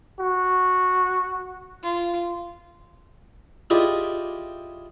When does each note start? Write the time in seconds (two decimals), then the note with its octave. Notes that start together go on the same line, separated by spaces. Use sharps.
0.19 F#4
1.82 F4
3.70 E4 F4 G4 G#4 D5 D#5